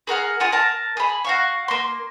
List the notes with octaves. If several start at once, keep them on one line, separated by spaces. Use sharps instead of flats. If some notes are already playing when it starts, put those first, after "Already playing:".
G#4 A#4 F#5 F6
F4 G#4 F#5
A#4 A5
G#4 B5
F#4 F5 C#6
A#3 C6